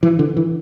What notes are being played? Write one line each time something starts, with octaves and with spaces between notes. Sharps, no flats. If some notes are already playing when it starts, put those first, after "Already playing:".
E3
D3
E3